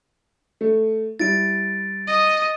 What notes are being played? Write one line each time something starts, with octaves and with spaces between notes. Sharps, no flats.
A3
G3 E4 A6 D7
D#5